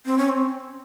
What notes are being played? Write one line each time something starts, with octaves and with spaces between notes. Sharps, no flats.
C4
C#4
C4